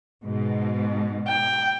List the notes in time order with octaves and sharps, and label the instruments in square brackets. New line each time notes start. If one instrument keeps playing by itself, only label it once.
[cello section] G#2 B2
[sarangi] G5